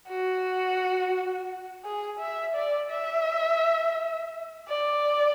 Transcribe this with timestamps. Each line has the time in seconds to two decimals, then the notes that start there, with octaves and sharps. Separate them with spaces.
0.08 F#4
1.84 G#4
2.19 E5
2.55 D5
2.91 E5
4.68 D5